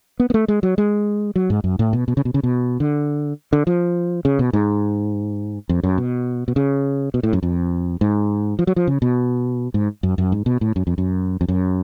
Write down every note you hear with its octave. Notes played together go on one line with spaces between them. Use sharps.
B3
B3
A3
G#3
F#3
G#3
F#3
G#2
F#2
A2
B2
B2
C#3
B2
C#3
B2
D3
D3
F3
C#3
B2
G#2
F2
F#2
B2
B2
C#3
B2
A2
F#2
F2
G#2
F3
F#3
F3
C#3
B2
G#2
F#2
F#2
G#2
B2
A2
F#2
F2
F#2
F2
F#2